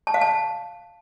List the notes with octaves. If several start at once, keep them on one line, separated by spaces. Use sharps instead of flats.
A5
F5
A5